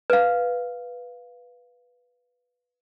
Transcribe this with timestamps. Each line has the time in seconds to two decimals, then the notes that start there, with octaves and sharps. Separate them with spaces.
0.10 B4 F5